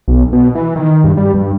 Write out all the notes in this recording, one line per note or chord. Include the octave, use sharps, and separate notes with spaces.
B1
B2
E3
D#3
G2
G3
G2